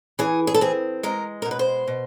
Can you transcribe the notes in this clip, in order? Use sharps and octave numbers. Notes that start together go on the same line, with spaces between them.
E3 G#4
G#4
A4
C4 G#4
G#3 A#4
B2 A#4
B4
C5
B2